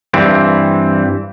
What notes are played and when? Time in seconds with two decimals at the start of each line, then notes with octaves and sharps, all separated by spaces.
0.14 G2 E3 C4